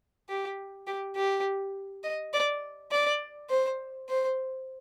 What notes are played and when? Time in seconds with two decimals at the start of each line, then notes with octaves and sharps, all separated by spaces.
0.29 G4
0.87 G4
1.16 G4
2.04 D#5
2.33 D5
2.91 D5
3.50 C5
4.09 C5